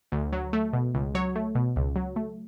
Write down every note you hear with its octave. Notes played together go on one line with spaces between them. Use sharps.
D2
F#3
A3
B2
C#2
F#3 C#5
A3
B2
C#2
F#3
A3